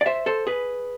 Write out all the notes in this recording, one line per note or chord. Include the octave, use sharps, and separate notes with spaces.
D5
C5 E5
A4 C5
G#4 B4